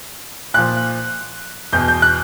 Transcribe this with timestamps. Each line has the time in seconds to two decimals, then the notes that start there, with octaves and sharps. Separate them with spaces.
0.54 A#2 F3 F#6
1.73 E2 B2 G6
1.88 G6
2.02 F#6